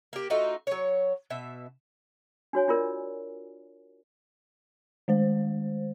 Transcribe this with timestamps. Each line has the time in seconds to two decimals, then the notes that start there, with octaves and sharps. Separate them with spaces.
0.13 A#3 G4
0.30 A3 D#4 F4 F#4
0.67 F#3 C#5
1.30 B2 E5
2.53 D4 F#4 C#5 G#5
2.68 D4 F4 A#4 D5
5.08 D#3 G#3 C5